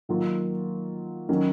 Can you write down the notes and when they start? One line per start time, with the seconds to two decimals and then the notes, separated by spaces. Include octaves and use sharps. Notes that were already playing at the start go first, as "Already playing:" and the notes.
0.09 D#3 F#3 A#3 F4
1.29 D#3 F#3 C#4